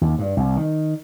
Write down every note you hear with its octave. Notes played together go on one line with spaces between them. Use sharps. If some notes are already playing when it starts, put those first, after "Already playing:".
D#2
G2
C2
D#3